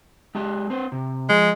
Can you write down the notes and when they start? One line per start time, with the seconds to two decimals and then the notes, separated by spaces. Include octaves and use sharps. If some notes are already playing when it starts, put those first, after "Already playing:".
0.35 G#3 G4 A5
0.70 C4 B4 C5
0.92 C3
1.29 F3 G#3